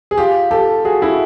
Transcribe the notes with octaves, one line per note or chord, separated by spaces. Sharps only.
G#4
F4 G4
G4 A4
F#4 G#4
E4 F#4